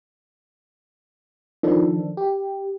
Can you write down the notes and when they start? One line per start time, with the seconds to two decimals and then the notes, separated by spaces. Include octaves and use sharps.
1.63 D#3 F3 D4 A4
2.17 G4